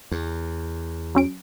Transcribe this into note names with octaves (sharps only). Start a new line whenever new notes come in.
E2
F#3 C#4 D7